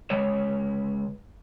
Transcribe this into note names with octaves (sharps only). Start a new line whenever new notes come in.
C#3 G#3 B4 C#5